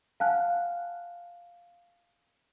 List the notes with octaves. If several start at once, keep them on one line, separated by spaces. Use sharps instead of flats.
F5 F#5 G#5 A5 F6 F#6